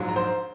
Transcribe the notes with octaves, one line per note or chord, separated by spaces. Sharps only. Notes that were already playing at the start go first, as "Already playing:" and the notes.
Already playing: A#1 G#2 F#3
A#5
C5 C6